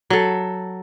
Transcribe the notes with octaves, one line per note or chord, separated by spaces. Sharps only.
F#3 A4